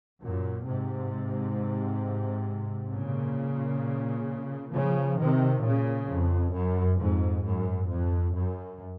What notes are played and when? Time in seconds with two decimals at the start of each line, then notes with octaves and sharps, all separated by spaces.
0.22 F#2 A#2
0.66 G#2 C3
2.92 A#2 C#3
4.74 C#3 F3
5.18 C3 D#3
5.63 A#2 C#3
6.08 F2
6.54 F#2
6.99 F2 G#2
7.44 F#2
7.89 F2
8.34 F#2